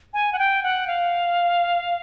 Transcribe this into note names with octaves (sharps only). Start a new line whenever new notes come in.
G#5
F#5
G5
F#5
F5